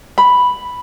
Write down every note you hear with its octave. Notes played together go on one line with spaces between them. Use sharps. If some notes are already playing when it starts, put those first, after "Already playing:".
B5